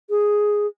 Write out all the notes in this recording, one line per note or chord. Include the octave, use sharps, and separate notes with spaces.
G#4